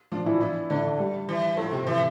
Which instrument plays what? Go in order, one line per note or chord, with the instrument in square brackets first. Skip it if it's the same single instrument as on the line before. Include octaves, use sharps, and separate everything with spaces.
[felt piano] F3 F4 [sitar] D4
[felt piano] E3 E4
[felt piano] E3 E4 [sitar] B3
[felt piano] D3 D4 [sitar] A3
[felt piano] G3
[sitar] E3
[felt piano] A2 A3 [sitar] F3
[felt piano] C3 C4
[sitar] E3